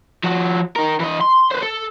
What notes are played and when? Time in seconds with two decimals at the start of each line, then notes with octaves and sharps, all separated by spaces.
0.24 F3 F#4
0.76 D#4 A#4
1.00 E3 D#5
1.21 C6
1.51 B4 C5
1.62 A4